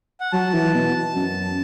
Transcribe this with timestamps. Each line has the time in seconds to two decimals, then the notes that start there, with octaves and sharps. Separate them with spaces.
0.20 F#5
0.32 F#3 A5
0.54 E3
0.74 B2
1.15 F#2